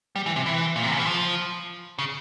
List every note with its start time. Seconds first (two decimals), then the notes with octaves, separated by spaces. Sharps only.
0.16 G3
0.26 E3
0.36 C3
0.46 E3
0.76 A#2
0.83 C3
0.91 C#3
0.99 E3
1.07 F3
1.99 C#3